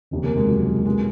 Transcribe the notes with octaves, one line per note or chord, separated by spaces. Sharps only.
F1 D#2 C#3
A#3
G#3
F#3
C#2 B2 G#3